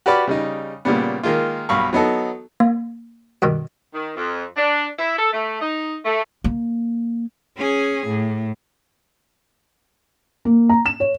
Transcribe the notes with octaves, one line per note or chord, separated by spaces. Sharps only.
F#4 G4 B4 D5 B5 F6
C#3 G3 D#4
A#2 C#3 G3 B3
D#3 G#3 A#3 F4
B1 G2 F5 B5 C#6
F#3 B3 D#4 A4
A#3
G2 B2 D#3
D#3
F2
D4
E4
A4
A3
D#4
A3
A#3
C#4 G#4
A2
A#3
A#5
E7
C#5